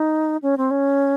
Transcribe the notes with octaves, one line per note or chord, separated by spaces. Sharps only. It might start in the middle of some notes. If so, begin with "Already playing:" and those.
Already playing: D#4
C#4
C4
C#4